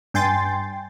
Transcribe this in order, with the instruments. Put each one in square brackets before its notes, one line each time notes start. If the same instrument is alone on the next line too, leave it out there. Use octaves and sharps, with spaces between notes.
[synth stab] G2 G5 G#5 C6 A6